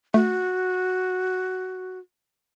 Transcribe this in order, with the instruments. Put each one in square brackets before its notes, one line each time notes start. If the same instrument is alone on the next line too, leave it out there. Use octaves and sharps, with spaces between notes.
[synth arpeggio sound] A3 [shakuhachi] F#4